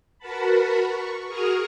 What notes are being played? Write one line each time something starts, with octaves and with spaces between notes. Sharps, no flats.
F#4 A#4 B4 F#5 A5 B5
C#6
F#4 G#4 A#4 C#6 D#6 F6